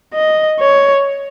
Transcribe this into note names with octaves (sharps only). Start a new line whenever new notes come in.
D#5
C#5